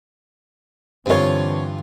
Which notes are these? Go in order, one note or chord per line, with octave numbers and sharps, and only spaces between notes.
G2 D3 E3 C4 F4 C#5